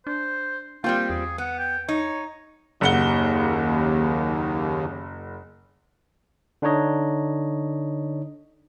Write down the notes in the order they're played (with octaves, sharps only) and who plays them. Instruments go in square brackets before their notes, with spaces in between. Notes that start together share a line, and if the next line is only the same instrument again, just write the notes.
[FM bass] D4 [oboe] C5
[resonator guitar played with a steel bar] G3 C4 F4 [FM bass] A#3 [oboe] G5
[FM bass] E2 [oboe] G#4
[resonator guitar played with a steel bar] B3 [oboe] F#5
[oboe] G5
[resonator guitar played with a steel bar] D#4 [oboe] C#5
[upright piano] F#1 F#5 G7 [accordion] D#2
[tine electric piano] D3 D4 D#4 C#5 D#5